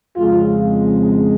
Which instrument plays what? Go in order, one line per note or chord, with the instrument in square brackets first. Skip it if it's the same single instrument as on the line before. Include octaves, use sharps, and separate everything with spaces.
[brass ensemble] F2 C#3 G#3 F4